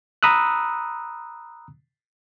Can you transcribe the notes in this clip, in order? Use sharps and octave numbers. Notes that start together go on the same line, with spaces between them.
A#5 B5 D#6 E6 F#6